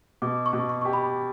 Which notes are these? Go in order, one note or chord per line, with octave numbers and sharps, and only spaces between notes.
B2 D6
C#6
B2
C#6
G4 C#6
B5